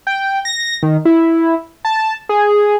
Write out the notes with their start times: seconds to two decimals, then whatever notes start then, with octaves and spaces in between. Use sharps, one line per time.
0.07 G5
0.45 A#6
0.83 D#3
1.05 E4
1.85 A5
2.29 G#4